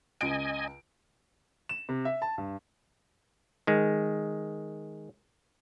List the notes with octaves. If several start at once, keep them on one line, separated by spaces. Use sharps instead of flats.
C#2 D#5 G#5 D7
E7
C3
E5
A5
G2
D#3 G#3